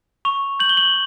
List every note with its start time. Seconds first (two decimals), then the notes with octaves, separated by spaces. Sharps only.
0.25 C#6 F7
0.60 G6 F#7
0.69 G7
0.77 F#7